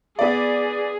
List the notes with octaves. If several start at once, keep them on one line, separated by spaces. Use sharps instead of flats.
B3 G#4 D5